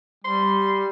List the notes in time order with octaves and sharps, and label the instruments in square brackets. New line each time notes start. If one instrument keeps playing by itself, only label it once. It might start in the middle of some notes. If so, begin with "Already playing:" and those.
[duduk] G3 [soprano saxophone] C6